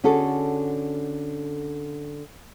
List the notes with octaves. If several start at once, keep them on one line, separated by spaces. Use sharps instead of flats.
D3 C#4 F#4 G#4 A4